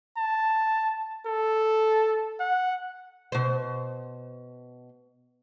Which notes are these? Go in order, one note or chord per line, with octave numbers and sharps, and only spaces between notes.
A5
A4
F#5
B2 C5